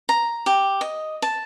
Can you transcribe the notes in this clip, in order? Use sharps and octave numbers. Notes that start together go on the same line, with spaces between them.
A#5
G4
D#5
A5